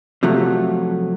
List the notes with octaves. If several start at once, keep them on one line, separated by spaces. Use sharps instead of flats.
C3 F3 F#3 A3